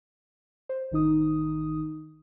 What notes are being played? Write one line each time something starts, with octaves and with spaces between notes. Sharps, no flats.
C5
A1 D#3 D#4 D#6